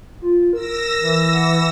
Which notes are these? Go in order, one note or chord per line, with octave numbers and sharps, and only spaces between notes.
F4
A#4 E6 A#6
E3
F#5